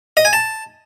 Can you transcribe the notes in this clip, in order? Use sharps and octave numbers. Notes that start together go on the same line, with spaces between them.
D#5
G#5
A5